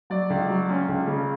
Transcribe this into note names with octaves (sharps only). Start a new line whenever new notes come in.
F#3 D5
C#2
F#3
C#4
C#2
C#3